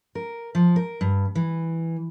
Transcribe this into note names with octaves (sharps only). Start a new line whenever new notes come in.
A#4
F3
A#4
G2
E3